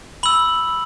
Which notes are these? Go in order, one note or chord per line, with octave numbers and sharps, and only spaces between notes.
B5 E6 F#7